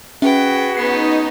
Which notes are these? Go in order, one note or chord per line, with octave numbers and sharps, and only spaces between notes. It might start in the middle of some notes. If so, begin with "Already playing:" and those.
C#4 F#4 G#4 B4 E5 G5
B3 C#4 D#4 C7